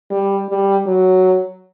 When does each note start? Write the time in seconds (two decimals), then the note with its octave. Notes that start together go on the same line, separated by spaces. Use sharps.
0.11 G3
0.50 G3
0.87 F#3